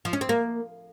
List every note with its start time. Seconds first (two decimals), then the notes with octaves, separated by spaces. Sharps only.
0.05 F3
0.13 C#4
0.21 C4
0.29 A#3